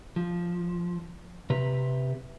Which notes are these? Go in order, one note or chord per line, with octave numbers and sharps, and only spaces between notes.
F3
C3 G4 B4 A#5